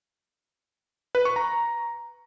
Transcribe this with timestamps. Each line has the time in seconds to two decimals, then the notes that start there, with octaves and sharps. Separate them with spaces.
1.15 B4
1.25 C#6
1.36 A#5